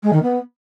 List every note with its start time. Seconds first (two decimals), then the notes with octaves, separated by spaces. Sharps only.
0.03 G#3
0.12 D#3
0.22 B3